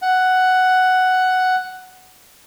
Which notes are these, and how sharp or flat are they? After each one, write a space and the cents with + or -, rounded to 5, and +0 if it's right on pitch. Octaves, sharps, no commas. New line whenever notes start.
F#5 +5